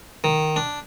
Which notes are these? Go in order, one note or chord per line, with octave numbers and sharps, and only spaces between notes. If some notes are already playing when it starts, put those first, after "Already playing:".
D#3
D4